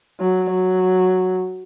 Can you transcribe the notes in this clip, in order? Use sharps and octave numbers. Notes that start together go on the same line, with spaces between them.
F#3
F#3